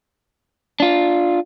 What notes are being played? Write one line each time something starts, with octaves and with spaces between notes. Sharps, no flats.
D4 F4